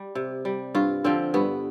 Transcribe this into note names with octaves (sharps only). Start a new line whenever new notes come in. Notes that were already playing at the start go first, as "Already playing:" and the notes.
Already playing: G3
C3
G3
G2 F4
D3 F3 C4
G2 B3